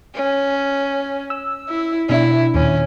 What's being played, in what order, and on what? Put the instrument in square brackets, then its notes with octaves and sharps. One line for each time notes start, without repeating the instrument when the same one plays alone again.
[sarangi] C#4
[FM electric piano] E6
[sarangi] E4
[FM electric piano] B2 D4 E5 [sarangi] E4
[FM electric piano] D#2 A#2 [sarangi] C#4